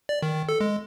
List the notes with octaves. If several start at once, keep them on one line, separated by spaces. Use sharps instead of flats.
D5
D#3
A4
G#3